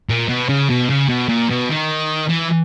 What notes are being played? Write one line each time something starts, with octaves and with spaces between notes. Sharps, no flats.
A#2
B2
C#3
B2
C#3
B2
A#2
B2
D#3
E3